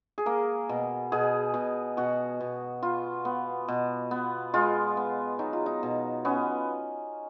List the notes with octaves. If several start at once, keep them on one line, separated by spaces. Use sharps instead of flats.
G#4
A#3 A#4
B2
B2 G#4
B2
B2 F#4
B2
B3 F4
B3
B2
B3
G#3 F4
B3
F#3 D#4
F4
D#4
B2
B3 C#4